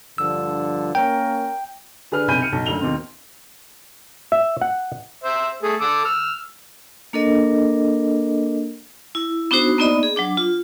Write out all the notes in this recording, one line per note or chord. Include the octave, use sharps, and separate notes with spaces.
G2 D3 F3 E6
A#3 C#4 A#4 G5
D3 G#4 B4 F6
B1 C3 G#5 B5 G6 D#7
F6 C#7 D#7
B1 A5
F#1 D2 F7 G7
D#2 B2 C4
E5
F#5
C5 E5
A3 G#4
A4 D6 E6
E6 F6
A#3 D4 A4 A#4 D#5
E4
B3 D4 D#4 F#4 C5
A#3 B3 D#4 D5 D#5 B5
G#4
F#3 D4 D6
F4